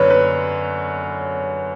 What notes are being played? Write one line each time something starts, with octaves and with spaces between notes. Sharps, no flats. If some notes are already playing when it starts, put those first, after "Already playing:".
Already playing: F#2 D3 B4 C#5
B4